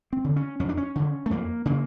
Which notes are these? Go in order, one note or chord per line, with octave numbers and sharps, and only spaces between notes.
C4
D3
C#4
F2 C#4
D4
C#4
D3
A3
F2 A#3
C#3 A#3